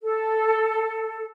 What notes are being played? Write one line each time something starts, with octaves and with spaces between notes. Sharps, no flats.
A4